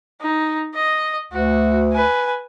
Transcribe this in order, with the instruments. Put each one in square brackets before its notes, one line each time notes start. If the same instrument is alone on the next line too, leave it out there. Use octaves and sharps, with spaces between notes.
[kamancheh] D#4
D#5
[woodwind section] D2 [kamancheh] F#4
[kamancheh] B4 G#5